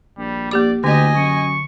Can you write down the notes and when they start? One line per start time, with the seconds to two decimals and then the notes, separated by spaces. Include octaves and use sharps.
0.18 A#1 G3
0.51 A#3 G4 D5 D6
0.84 D2 D3 G4 D#5 G#5
1.16 F#2 C#6